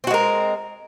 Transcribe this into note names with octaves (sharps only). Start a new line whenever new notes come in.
G#3 C4 F#4 A#4